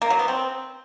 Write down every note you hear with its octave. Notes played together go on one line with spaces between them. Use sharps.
A#3
F#3
B3
C4